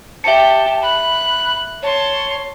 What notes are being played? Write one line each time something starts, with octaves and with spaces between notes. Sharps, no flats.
G4 E5 A5 C#7
B5 F#6
C#5 A5 C6